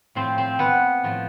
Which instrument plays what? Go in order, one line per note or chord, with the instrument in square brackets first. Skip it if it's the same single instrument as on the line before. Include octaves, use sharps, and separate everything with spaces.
[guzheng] A2 F3 C4 C5
C4 C5
B3 B4
A2 F3